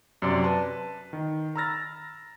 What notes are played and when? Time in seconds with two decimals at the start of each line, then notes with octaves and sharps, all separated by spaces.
0.22 F#2 C3 F#3 D5 C6
0.44 B4 A5
1.13 D#3
1.56 A#5 B5 E6 F6 A6 A#6